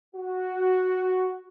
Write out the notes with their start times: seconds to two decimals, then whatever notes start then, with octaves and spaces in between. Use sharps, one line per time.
0.15 F#4